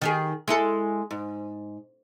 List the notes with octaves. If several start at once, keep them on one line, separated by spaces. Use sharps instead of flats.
D#3 G4 G#4
G#3 E4 A4
G#2